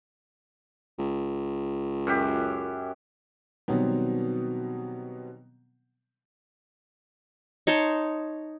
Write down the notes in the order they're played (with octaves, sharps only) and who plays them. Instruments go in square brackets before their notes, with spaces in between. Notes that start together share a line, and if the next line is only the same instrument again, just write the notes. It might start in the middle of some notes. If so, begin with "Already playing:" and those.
[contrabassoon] C#2
[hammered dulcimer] F#2 G4
[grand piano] B2 D#3 F#3 G3 B3 C4
[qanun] D#4 C#5 A5 C6